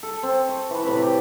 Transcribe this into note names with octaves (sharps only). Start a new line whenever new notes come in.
A4
C4
C#6
E3 B4
A2 C3 B5
G4